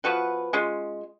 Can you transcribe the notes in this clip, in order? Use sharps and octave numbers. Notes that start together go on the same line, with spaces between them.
F3 B3 F#4 B4
G#3 C#4 F4